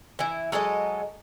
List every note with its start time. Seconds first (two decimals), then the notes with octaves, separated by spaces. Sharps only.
0.19 E3 E4
0.52 F#3 G#3 A4 D#5